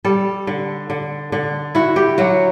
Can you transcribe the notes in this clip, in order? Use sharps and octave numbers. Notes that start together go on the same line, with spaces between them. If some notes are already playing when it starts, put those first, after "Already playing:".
G3 A4
D3
D3
D3
E4 F#4
G4
F#3 F#4